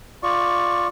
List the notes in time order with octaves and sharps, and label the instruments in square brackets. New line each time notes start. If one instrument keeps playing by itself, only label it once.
[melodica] F4 D5 C#6